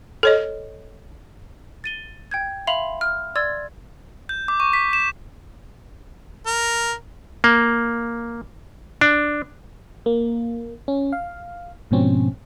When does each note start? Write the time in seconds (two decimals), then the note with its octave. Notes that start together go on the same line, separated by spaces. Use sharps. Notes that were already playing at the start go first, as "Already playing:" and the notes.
0.23 A4 C#5 D#5
1.84 A6 D#7 G7
2.31 G5 G6 G#6
2.67 E5 F5 B5 C6 F7 F#7
3.01 F6
3.35 D5 C6 E6 G#6 A6
4.29 G6
4.48 D6
4.60 C#6
4.73 B6
4.93 E7
6.46 A#4
7.44 A#3
9.01 D4
10.06 A#3
10.88 C#4
11.12 F5
11.91 G#2 B2 F3 C4 C#4